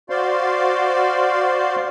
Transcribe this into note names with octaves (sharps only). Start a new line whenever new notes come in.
F#4 C5 D5 F5 C6